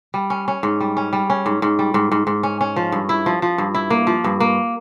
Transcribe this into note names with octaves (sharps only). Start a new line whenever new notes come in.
G3
C#4
C#4
G#2
G3
C#4
G3
C#4
G#2
G#2
G3
G#2
G#2
G#2
C#4
C#4
F3
G2
E4
F3
F3
G2
E4
A#3
F3
G2
A#3